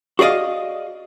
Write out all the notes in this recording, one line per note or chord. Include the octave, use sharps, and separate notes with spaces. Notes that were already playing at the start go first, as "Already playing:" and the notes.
F#4 G#4 D5 D#5 F5